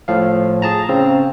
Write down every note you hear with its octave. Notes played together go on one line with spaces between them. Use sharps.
A2 F3 F5
G#4 A5 A#5
C#3 C4